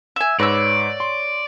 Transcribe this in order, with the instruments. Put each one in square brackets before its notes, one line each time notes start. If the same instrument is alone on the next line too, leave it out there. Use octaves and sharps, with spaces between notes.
[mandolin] E5 G#5
[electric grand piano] G#2 B4 A#6 [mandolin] C#5 E6 [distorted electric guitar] D5
[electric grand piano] C6